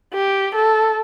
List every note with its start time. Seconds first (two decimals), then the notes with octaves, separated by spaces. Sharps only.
0.14 G4
0.55 A4